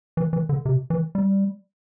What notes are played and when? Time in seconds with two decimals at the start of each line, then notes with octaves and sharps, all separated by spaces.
0.17 E3
0.33 E3
0.49 D3
0.65 C3
0.90 E3
1.15 G3